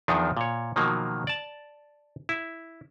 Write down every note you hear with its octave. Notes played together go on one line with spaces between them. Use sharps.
E2 D#3 F3 D4 D#4
A#2 C#5
B2 D#3 F3 F#3 A#3
D5 A5
E4